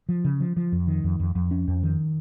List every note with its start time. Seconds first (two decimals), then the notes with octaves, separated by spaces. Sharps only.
0.09 F3
0.24 C#3
0.40 F3
0.57 F3
0.72 F2
0.87 D#3
1.04 F2
1.20 F2
1.35 F2
1.51 C#4
1.68 F2
1.83 D#3